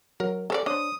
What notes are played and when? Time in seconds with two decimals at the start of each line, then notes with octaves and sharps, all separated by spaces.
0.20 F#3 A#4
0.50 G#4 A4 C#5 D5 G#5
0.66 D4 C5 C#5 D#6